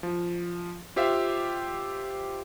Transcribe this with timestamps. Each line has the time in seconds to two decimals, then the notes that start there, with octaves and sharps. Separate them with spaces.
0.03 F3
0.96 F4 G4 C5 E5 F5